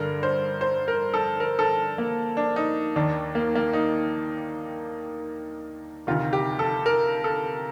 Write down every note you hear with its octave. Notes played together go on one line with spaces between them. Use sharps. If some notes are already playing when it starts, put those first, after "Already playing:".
Already playing: G2 D3 A#4
C5
C5
A#4
A4
A#4
A4
A#3
D4
D#4
D#2 D#3 D4
A#3
A#3
D#4
D2 C3 D#3 F4
G4
A4
A#4
A4